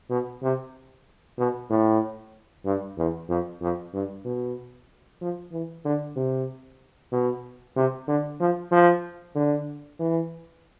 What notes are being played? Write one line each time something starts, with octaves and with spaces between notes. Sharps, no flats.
B2
C3
B2
A2
G2
E2
F2
F2
G2
B2
F3
E3
D3
C3
B2
C3
D3
F3
F3
D3
E3